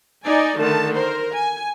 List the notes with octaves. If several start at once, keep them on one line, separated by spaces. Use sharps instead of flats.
D#4 D5 G#5
D3 D#3 A3 A5
A#4 C5
G#5